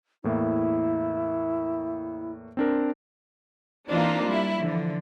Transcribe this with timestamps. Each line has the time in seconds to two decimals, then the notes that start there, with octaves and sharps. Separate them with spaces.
0.24 E2 A2 A#3 E4
2.57 C4 D4 A#4
3.90 E3 A#3 C4 D4 D#4 F4
4.26 G3 E4
4.58 D3 E3 F3